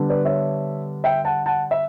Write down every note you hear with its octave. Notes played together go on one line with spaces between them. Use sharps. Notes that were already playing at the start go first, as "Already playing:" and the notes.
Already playing: D3 G3 B3 D4
B4 D5
C#5 E5
E5 G5
F#5 A5
F#5 A5
E5